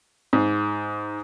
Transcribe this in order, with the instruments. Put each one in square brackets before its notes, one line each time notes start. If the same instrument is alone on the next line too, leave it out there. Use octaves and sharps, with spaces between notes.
[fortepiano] G#2